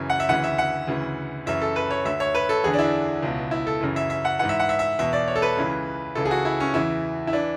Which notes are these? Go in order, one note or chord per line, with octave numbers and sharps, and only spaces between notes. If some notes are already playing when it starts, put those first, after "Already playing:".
Already playing: F#2 C#3 E3
F#5
E5
D2 C#3 E3 F#5
E5
F#5
D2 C#3 E3
F#2 C#3 E3 E5
A4
B4
C#5
D2 D3 E5
C#5
B4
A4
E2 D3 G#4
D4
E4
C#2 B2
E4
A4
F#2 C#3 E3
E5
E5
F#5
G#2 E3 F#5
E5
F#5
E5
E5
E2 B2 E5
D5
C#5
A4
B4
C#2 C#3 E3
C#2 C#3 E3 A4
G#4
F#4
E4
C#4
E2 C#3 E3 E4
E4
E3 D4